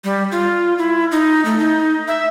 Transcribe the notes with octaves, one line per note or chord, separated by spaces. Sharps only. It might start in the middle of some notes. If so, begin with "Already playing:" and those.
G3
F4
E4
D#4
A3
D#4
E5